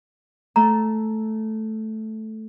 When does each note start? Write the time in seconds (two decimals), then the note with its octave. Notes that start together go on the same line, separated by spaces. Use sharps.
0.56 A3 A4 A#5